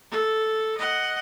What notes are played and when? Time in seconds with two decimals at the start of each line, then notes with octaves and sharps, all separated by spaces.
0.11 A4
0.78 D#5 F#5